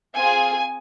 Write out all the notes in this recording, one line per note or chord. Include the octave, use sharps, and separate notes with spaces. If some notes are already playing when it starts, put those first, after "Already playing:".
C4 F4 G#4 G#5